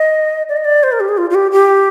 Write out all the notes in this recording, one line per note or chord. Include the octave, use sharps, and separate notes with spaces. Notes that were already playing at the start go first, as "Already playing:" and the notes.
Already playing: D#5
D5
D#5
D5
C5
A#4
G4
G#4
F4
F4
G4
G4